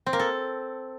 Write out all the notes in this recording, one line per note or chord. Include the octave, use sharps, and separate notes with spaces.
C4
A#3
A4